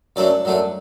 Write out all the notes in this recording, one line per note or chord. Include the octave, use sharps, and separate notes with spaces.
F#2 F#3 A3 D4 D5
F#2 F#3 A3 D4